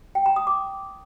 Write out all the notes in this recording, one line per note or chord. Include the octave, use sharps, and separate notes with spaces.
G5
A#5
D#6
D6